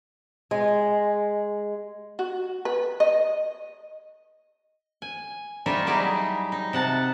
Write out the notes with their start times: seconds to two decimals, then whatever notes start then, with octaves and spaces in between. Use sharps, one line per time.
0.51 G#3
2.19 F#4
2.65 B4
3.00 D#5
5.02 G#5
5.66 G3 D#4 F4 C#5 E5
5.86 F#3 G3 D#4 E4 G4 G#4
6.52 D#4
6.73 C3 F#5 A5